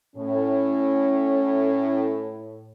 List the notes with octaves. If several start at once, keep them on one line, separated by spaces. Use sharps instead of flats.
A2 C#4